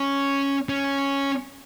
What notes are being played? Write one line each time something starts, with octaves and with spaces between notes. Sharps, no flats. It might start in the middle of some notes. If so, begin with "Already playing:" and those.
Already playing: C#4
C#4